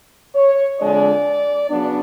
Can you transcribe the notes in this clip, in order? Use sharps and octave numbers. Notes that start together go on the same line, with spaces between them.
C#5
F2 D3 G#3 D4 D5
C#3 F#3 B3 D4